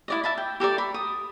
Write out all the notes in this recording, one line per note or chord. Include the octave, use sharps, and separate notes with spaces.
E4 D5 D#5
E5 A5 B5
G5
G4 A4 A#4 D5
B5
D#6